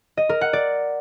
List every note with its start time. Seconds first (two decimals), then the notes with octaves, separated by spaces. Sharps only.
0.17 D#5
0.29 A#4
0.41 F#5
0.53 D5